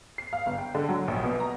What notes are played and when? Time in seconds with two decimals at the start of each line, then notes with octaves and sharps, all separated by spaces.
0.18 C7
0.33 F5
0.46 G1
0.58 G5
0.75 D3
0.89 F#3
1.08 A#1
1.24 B2
1.40 A#5